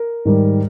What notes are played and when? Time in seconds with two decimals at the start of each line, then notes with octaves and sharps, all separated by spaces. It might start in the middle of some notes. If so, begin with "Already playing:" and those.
Already playing: A#4
0.25 G#2 D#3 G3